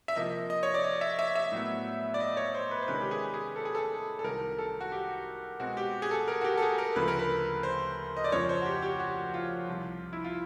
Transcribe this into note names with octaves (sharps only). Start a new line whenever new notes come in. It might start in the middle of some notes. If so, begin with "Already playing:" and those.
E5
C3 F3 A#3 D#5
D#5
C#5
D5
D#5
E5
E5
E5
A2 F#3 B3
D5
D#5
C#5
C5
B4
C5
C3 D#3 G#3 C#4 B4
G4
G#4
G#4
A4
G#4
A4
A4
C2 C3 D#3 F#3 A#4
A4
F#4
G4
B2 G#3 C4 F#4
G4
G#4
A4
A#4
F#4
G4
A4
G#4
A#4
D2 C#3 F3 A3 B4
A#4
B4
C5
D#5
D5
F2 C#3 F3 C#5
C5
F#4
G4
G4
F#4
F4
C2 C3 F3
E4
F4